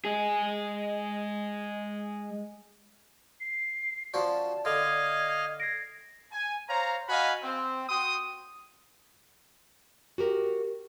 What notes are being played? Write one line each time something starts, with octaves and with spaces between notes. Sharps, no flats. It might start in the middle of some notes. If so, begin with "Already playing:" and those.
G#3 G#4
C7
F3 C#4 F#4 D5 A5
D3 D#5 F5 G#6
G#6 A#6 C7 D7
G#5
C5 C#5 F5 A#5
F#4 D#5 F5 F#5 G#5 B5
C4
F#4 G5 C6 D#6
F#4 G4 A#4